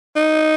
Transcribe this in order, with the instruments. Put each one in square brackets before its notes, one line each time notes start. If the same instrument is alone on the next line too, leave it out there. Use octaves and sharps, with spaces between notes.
[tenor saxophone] D#4